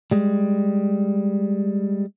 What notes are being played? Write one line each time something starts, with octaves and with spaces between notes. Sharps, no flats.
G3 G#3